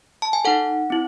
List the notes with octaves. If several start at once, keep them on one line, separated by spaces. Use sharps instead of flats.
A5
G#5
D#4 A4 F#5
C4 E4